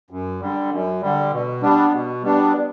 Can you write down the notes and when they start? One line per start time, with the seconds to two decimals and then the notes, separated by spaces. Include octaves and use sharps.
0.10 F#2
0.40 D3 G3
0.71 F#2
1.02 D3 G3
1.31 B2
1.61 G3 B3 D4
1.92 B2
2.22 G3 B3 D4